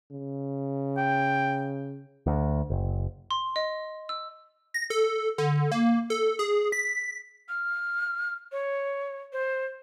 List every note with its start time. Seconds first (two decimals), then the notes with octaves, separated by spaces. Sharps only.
0.11 C#3
0.97 G5
2.26 D2
2.70 F#1
3.31 C6
3.56 D#5
4.09 E6
4.74 A#6
4.90 A4
5.38 D3
5.72 A#3
6.10 A4
6.39 G#4
6.72 B6
7.49 F6
8.52 C#5
9.33 C5